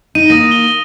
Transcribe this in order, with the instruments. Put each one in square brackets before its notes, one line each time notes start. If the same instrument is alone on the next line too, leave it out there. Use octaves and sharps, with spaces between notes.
[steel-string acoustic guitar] D#4 [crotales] D#7
[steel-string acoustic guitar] A#3 [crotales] D#6 A#6
[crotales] G7